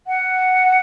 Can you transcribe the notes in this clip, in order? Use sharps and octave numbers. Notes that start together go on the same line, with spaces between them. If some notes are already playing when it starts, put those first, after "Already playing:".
F#5